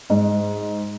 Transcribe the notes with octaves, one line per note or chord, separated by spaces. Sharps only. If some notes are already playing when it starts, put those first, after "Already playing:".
G#2